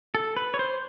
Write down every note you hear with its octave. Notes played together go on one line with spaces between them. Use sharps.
A4
B4
C#5
C5